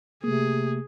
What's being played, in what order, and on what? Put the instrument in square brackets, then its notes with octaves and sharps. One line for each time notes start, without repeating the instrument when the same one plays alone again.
[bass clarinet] C3 [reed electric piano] A3 A#3 [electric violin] G#4